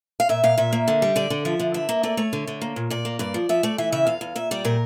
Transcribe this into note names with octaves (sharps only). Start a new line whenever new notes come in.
F5
A#2 E5
A#2 F5
A#2 E5
A#3
D3
G3
D3 D5
D3
F3 E5
D3
G2 E5
A#3
A3 D5
A3 C#5
D3
D3
A#3
A#2
A#2 D5
A#3
G2 D5
F3
F3 E5
A3 D5
E3 E5
C#3 E5
E2 F5
E2
A#2 E5
G3 D5
A#2 A#4